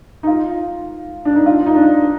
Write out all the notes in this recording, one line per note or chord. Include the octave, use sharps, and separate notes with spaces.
D#4
F4
D4
D#4
F4
D#4
D4